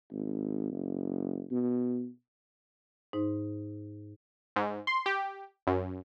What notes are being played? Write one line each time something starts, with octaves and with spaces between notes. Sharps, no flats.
G#1
F#1
B2
G#2 D#4 C5
G#2
C6
G4
F#2